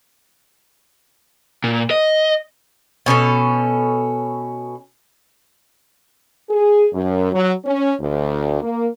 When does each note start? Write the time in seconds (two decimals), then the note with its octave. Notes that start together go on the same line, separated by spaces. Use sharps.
1.64 A#2
1.91 D#5
3.06 B2 C#4 D4 A4
6.50 G#4
6.93 F#2
7.32 F#3
7.65 C#4
8.00 D2
8.62 A#3